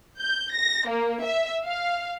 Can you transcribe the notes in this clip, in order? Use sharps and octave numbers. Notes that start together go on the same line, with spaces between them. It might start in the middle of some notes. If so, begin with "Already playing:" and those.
G6
A#6
A#3
E5
F5